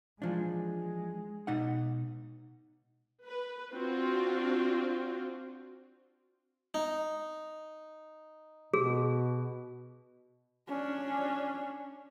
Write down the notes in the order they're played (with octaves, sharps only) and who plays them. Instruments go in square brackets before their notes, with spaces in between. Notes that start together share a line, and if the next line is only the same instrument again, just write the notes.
[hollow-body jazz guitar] E3 F3 D4 [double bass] G#3
[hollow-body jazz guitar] B2 D#4 F#5
[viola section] B4
C4 D4 F4 F#4
[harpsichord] D#4
[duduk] B2 [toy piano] G#4
[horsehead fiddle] C#4 D4